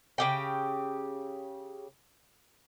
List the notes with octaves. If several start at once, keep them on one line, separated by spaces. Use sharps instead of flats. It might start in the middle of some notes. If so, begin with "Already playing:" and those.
C#3 G4 G5